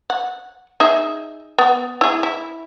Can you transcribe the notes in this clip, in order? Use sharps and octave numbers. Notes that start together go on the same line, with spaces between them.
F#5
D#4 G#4 E5
B3
E4 G#4
E4